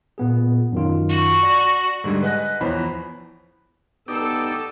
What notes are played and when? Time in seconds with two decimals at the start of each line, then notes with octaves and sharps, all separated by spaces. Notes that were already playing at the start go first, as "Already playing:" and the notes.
0.18 A#2 B3 G#4
0.72 F#2 D#3 F4
1.09 F#4
1.43 D5 A#6
2.04 G#2 D3 G3 G#3
2.23 B4 D#5 F#5 G#5 F#6 A#6
2.61 E2 E3 F3 C5 C#5 B5
4.08 B3 D#4 G4 A4 D5